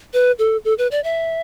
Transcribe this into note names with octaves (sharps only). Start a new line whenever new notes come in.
B4
A4
A4
B4
D5
E5